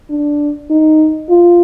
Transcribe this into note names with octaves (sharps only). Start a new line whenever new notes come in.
D4
D#4
F4